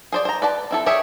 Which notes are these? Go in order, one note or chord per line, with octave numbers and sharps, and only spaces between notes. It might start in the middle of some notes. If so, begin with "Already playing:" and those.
G#4 C5 D5
C5 A#5
B4 D5 A5
C4 E4 A4
G4 G#4 C#5 E5